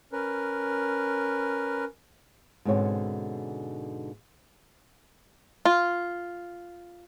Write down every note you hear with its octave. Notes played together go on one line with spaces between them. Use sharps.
C#4 A#4 B4
G#2 B2 D3 C4 C#5 F#5
F4